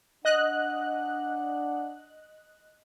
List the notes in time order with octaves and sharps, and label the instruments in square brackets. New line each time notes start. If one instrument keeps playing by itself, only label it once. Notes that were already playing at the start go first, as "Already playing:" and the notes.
[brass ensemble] D4 F#5 [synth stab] D#5 F#6